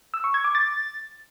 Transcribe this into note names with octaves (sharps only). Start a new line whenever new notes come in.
E6
C#6
G#6
D6
A6